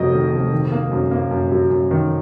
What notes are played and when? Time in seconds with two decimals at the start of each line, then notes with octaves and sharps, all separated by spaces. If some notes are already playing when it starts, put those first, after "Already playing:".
Already playing: F1 F2 F#3 A#4 D#5
0.12 D#3
0.32 F1
0.52 D#3
0.72 A#3
0.92 F#2
1.11 A#3
1.31 F#2
1.51 F#3
1.71 F#2
1.91 D#3